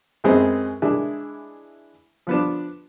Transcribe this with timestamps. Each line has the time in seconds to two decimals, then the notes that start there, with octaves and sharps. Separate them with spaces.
0.24 F#2 D#3 G#3 B3 C4
0.82 E3 G#3 D4 E4
2.27 F3 B3 D4